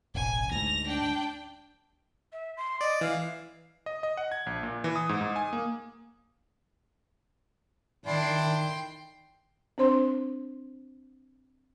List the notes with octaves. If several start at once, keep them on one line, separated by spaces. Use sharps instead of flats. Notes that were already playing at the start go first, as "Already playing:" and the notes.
E1 A1 G#5
D2 G#2 A#6 F7
D4 G5
E5
C6
D5 D#5
E3 F5
D#5
D#5
F#5
G#6
A#1
A#2
E3
D#6
G#2
G#2
G#5
A#3
D#3 D4 E4 G5 C6
C4 D4 C5 C6